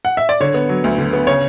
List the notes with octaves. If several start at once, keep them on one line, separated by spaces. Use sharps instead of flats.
F#5
E5
D5
D3 C#5
B3
F#3
D2
D3
B3
C#3 C#5